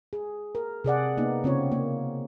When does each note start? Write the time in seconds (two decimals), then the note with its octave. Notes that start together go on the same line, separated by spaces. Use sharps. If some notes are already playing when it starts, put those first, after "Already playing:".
0.13 G#4
0.55 A#4
0.84 C3 G#4 D5 F#5
1.17 A#3 B3 D#4
1.44 C#3 C4 F4 C#5
1.72 A#3